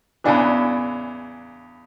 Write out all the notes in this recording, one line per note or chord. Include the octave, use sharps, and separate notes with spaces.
E2 C#3 E3 D4